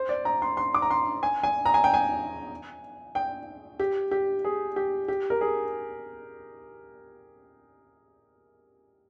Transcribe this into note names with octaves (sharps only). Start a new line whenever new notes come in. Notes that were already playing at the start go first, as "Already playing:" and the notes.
Already playing: C5
D5
A#5
C6
C6
D6
A#5
C6
G#5
G#5
A#5
G#5
G5
G#5
G5
G4
G4
G#4
G4
G4
A#4
G#4